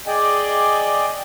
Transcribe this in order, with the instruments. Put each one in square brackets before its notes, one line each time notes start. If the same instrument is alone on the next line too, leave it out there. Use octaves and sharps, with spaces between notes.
[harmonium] G#4 D5 D#5 G5 G#5